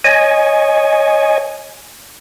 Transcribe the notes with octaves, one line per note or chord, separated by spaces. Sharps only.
C#5 D#5 G#5